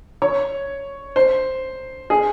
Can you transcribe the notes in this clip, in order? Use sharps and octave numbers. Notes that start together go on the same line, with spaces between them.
C#5
C5
G#4